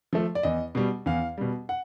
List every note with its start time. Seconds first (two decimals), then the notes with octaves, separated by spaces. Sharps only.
0.13 F3 A3
0.35 D5
0.43 E2 D#5
0.75 B2 G3
1.06 E2 F5
1.38 B2 G3
1.69 F#5